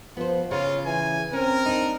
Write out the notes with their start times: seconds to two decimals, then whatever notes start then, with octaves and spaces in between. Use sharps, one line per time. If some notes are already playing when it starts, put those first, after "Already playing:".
0.17 F3 B3 C5
0.51 C#3 F4 C#5
0.86 E3 G#5
1.33 C4 C#4 A#4
1.66 D4 D#4